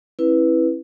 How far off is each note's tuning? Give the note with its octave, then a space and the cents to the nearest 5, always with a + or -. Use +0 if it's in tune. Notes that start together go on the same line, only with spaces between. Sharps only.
C#4 -45 E4 +0 B4 +0